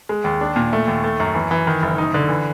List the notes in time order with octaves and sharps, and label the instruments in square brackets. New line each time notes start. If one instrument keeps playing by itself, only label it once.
[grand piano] G#3
D#2
D4
A#2
A3
D#2
A3
F#2
E3
E3
D#3
F#1
D#4
D3
E3